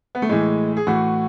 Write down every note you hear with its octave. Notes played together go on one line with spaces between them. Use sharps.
B3
A3
A2 E3 G#3
G#4
A2 E3 F#4